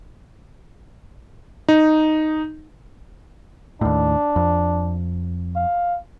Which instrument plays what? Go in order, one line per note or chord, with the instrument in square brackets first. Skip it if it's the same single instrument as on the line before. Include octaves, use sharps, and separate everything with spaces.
[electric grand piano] D#4
[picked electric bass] D#2 A2 [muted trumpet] D4
[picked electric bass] F2
[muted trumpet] F5